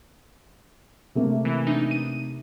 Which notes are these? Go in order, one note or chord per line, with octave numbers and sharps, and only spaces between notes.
C3 A3 A#3
E3
D4 D#4
D#7